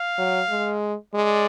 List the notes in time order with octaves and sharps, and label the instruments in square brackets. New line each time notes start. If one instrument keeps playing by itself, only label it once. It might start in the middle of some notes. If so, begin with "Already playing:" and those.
Already playing: [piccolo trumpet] F5
[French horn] F#3
G#3
[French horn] G#3 [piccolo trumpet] D5